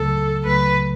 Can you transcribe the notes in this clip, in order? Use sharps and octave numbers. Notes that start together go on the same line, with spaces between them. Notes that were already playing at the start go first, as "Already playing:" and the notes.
Already playing: C#2 C#3 F#3 A3 A4
C#2 C#3 F#3 A3 B4